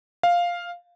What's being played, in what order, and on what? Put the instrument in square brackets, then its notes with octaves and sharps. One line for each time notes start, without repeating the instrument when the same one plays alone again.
[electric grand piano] F5